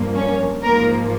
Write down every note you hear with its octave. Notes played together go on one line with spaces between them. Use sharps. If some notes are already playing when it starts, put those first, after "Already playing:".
Already playing: G2 F3 A#3
C#4 C#5
G#2 F3 A#3 A#4